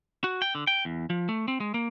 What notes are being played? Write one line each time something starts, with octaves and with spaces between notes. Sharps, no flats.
F#4
G5
D3
G5
E2
F3
A3
C4
G#3
A#3